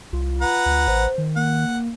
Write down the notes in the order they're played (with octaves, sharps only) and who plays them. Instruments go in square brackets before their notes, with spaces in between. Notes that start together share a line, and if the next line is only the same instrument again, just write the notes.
[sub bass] C2 [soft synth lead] F4
[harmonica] B4 F#5 A#5
[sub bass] D2
[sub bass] A1 [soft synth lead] C5
[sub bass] D#3
[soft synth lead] A#3 [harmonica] F#5